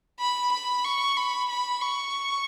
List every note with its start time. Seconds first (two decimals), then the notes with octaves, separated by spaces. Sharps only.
0.20 B5
0.52 B5
0.84 C#6
1.17 B5
1.50 B5
1.81 C#6